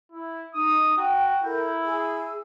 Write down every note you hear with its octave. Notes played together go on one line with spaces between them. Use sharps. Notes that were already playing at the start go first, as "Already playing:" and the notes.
E4
D#4 D#6
F#4 G5
E4 A4 A#4 G6
G#4 G#5 E6